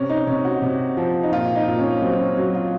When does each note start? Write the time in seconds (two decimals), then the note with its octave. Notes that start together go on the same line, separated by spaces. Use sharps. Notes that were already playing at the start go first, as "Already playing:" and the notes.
Already playing: C3 C#4
0.10 D#4
0.27 C3 C#4
0.45 F#4
0.62 C3
0.97 F3
1.23 D#4
1.32 A#2 F4
1.55 D#4
1.68 A#2
1.79 C#4
2.02 F#3 C4
2.20 C#4
2.37 F#3
2.55 F4